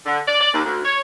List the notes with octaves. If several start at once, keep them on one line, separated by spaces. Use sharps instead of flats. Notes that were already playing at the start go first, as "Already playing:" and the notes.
D3
D5
D5
D#2
D2
C#5